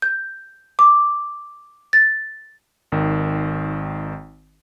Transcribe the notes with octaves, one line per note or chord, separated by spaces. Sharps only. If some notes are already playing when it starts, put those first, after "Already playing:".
G6
D6
A6
G#1 D#3